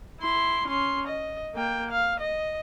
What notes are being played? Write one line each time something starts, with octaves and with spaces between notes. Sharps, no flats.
E4 C6
C#4 C6
D#5
A#3 G5
F5
D#5